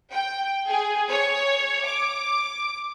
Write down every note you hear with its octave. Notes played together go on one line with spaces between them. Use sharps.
G5
G#4
C#5
D6